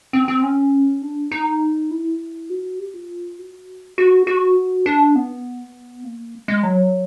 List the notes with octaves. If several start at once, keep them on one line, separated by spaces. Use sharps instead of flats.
C4
C4
C#4
D4
D#4
E4
F#4
G4
F4
F#4
F#4
F#4
D4
B3
A#3
G#3
F#3